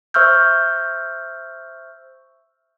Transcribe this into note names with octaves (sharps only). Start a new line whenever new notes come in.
C5 E5 C#6 E6 F6 G6